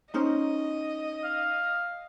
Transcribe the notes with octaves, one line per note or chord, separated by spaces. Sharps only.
C#4 D#4 C5 D#5
F5